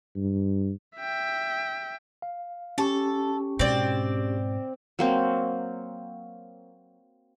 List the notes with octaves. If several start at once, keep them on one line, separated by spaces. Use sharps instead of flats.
G2
E5 G5
F5
C#4 G4 A4 C#6
G#2 B2 C4 D5
F#3 A#3 C4